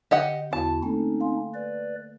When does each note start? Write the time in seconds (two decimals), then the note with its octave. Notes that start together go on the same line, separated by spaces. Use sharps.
0.11 D3 G4 D#5 F#5
0.53 E2 E4 F#4 A5
0.83 A3 A#3 C4 C#4 D#4 A4
1.20 F5 G#5 C6
1.54 B4 D5